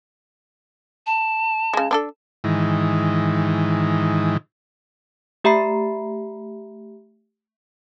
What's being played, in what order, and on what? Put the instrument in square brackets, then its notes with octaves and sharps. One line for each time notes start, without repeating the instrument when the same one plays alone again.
[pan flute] A5
[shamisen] C#3 G#3
C4 D4 A4
[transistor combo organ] G#2 D#3 E3
[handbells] A3 G4 E5 A#5 B5 C7